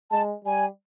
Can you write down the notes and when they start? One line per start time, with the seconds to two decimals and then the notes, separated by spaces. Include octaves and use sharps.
0.12 G#3 A5
0.45 G3 G#5